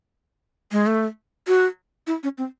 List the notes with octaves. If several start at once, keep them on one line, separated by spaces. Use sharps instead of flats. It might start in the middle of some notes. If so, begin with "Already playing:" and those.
G#3
A3
F#4
E4
C#4
C4